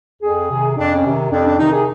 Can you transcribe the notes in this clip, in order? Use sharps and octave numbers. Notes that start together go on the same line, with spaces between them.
F2 G#4
C3 D#3
F2 D4
C#4
C3 D#3
F2 D4
D4
C3 D#3 D#4
G#4